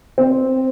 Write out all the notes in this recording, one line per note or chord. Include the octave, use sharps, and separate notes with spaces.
C4